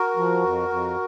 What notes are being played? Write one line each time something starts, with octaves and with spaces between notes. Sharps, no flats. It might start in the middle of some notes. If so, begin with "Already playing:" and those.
Already playing: F#4 A#4
F3
F2
F2